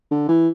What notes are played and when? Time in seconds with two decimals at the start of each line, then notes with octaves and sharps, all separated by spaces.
0.11 D3
0.29 E3